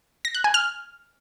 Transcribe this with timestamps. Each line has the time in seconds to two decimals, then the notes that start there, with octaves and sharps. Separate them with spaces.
0.25 A#6
0.35 F#6
0.44 G#5
0.54 F6